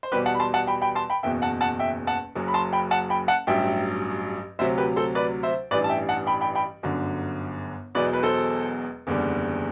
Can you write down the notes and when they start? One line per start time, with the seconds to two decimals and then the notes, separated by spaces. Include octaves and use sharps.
0.03 C5
0.12 E2 B2 G3 G4 B4
0.26 F#5 A5
0.35 B5
0.40 A5 C6
0.54 F#5 A5
0.67 G5 B5
0.82 G5 B5
0.95 A5 C6
1.10 G5 B5
1.23 F#1 E2 B2 E5 G5
1.42 F#5 A5
1.61 F#5 A5
1.79 E5 G5
2.07 F#5 A5
2.35 F#1 F#2 F#3
2.48 B5
2.54 A5 C6
2.73 G5 B5
2.91 F#5 A5
3.10 G5 B5
3.28 F#5 A5
3.47 A1 G2 F#3 E5 G5
4.59 D2 C3 F#3 C5 E5
4.78 G4 B4
4.96 A4 C5
5.15 B4 D5
5.43 C5 E5
5.71 A1 G2 E3 G3 B4 D5
5.84 A5
5.90 E5 G5
6.09 F#5 A5
6.27 G5 B5
6.41 G5 B5
6.55 G5 B5
6.83 G1 F#2 D3
7.95 E1 E2 B2 F#3 B4 D5
8.13 B4
8.23 A4 C5
9.07 F#1 E2 D3 G3